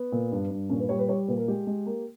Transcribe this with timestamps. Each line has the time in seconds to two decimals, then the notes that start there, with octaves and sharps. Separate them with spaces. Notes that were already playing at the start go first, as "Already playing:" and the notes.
Already playing: B3
0.12 A#2
0.32 G2
0.51 G2
0.70 A#2 C#4
0.79 B4
0.89 G3 C#5
0.99 B4
1.09 G3 C#5
1.28 A#2 B4
1.37 A#4
1.48 G#3 G4
1.67 G#3
1.86 A#3